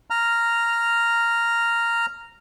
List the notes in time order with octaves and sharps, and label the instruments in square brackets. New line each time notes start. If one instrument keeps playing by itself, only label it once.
[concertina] A#5 F6